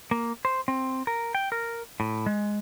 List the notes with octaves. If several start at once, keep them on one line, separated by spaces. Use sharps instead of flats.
A#3
C5
C4
A#4
G5
A#4
A2
G#3